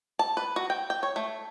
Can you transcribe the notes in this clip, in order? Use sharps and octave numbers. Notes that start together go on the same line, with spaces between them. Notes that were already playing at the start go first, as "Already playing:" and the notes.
A5
B4
F#4
G5
G5
C#5
A3